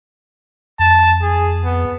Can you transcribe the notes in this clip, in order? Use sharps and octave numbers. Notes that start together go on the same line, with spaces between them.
F2 A5
G#4
B3